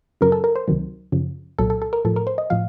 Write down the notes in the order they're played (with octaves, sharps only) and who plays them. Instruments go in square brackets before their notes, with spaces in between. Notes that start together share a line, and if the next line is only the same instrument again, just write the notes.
[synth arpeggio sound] F#2 C#3 F#3 A#4
A4
A#4
C5
C#2 C3 D#3 F#3
F#2 C#3 F3
C2 A#2 F#3 A4
A4
A4
A#4
A2 F3 A4
A#4
C5
D#5
A2 F3 F5